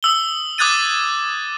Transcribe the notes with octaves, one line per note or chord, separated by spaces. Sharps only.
D#6 E6 G7
D6 D#6 F#6 G#6 A6 D#7